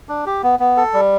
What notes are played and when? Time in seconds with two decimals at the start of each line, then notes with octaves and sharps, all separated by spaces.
0.09 D4
0.26 G4
0.43 B3
0.59 B3
0.77 A4
0.94 G3